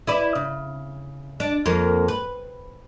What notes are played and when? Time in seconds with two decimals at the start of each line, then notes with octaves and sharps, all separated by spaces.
0.07 E4 B4 D5
0.35 C#3
1.40 D4
1.66 F2 A#3
2.08 B4